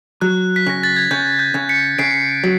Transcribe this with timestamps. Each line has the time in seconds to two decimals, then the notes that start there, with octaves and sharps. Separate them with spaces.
0.21 F#3 F#6
0.56 B6
0.66 C#3 A#6
0.83 A6
0.97 G#6
1.11 C#3 G6
1.39 G6
1.54 C#3
1.69 B6 C#7
1.99 C#3 C7 D7
2.44 F#3